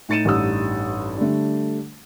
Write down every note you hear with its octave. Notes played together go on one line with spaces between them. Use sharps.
A2 D#4 A6 C#7 D#7 E7
A1 G2 D#4 D#6 E6
D3 G3 A3 D4